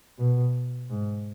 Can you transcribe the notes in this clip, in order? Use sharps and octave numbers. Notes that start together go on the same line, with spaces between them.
B2
G#2